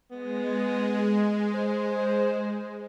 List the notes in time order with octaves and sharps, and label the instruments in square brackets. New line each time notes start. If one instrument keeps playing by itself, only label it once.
[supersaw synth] G#3 [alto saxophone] B3
[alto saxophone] C5